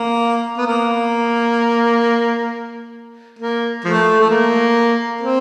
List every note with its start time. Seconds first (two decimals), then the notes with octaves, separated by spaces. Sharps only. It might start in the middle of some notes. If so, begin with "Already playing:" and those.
Already playing: A#3
0.57 B3
0.67 A#3
3.39 A#3
3.85 F3 A3
4.20 A3
4.30 A#3
5.21 C4